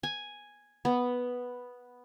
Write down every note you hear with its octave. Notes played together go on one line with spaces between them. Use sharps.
G#5
B3